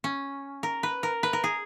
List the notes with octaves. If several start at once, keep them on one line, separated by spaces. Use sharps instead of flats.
C#4
A#4
B4
A#4
B4
A#4
G#4